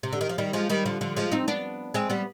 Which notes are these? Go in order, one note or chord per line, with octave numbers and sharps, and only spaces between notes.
C3
D3
D#3
F3
D#3 G3
F3 G#3
D#3 G3
D3 F3
D3 F3
F3 G#3
C4 D#4
B3 D4
G#3 C4
G3 B3